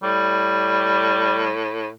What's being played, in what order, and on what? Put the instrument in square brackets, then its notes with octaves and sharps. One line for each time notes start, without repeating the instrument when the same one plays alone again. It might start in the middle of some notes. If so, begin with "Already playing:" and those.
[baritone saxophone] A2 [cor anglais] G3